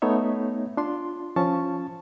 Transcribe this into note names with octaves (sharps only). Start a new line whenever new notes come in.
A3 B3 D#4 C#5 E5
D4 F4 C6
F3 C#4 A5 C#6